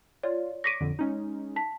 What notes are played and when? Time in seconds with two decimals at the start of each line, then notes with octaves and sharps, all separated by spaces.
0.23 F4 C#5 D5
0.64 C#6 D6 A#6 B6 D7 D#7
0.80 A#1 F2 D3
0.99 G#3 C#4 D#4
1.56 A5 B6